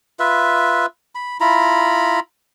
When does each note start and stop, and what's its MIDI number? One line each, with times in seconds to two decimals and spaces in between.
0.20 0.86 65
0.20 0.86 71
0.20 0.86 76
1.15 1.37 83
1.40 2.20 64
1.40 2.20 65
1.40 2.20 82
1.40 2.20 83